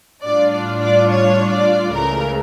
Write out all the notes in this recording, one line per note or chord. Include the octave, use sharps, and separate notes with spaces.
A2 G3 D4 F4 D5
D5
D5
C#5
D5
C#2 C#3 E3 A3 A#4